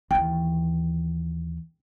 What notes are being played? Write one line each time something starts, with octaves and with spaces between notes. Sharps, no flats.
D#2 E3 G5